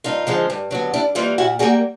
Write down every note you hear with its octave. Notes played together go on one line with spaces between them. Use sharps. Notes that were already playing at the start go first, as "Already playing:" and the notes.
G2 D#4 F4
D3 F3 G#3
G2
D3 F#3 B3
G2 D4 E4
E3 G3 A#3 D#4 F4
A#2 E4 F#4
G3 A#3 F#4 G#4